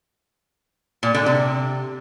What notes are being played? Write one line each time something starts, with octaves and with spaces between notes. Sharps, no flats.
A#2
D3
C3